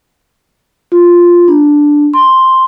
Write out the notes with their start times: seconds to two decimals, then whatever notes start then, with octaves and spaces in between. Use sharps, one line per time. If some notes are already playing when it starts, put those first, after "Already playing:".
0.92 F4
1.48 D4
2.14 C6